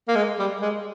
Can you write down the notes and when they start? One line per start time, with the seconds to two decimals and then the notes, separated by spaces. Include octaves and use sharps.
0.08 A#3
0.15 G#3
0.39 G3
0.62 G#3